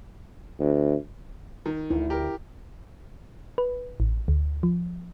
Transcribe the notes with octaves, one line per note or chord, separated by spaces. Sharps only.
D2
D#3
D2 E4
G4 A#4
B4
A1
D2
F3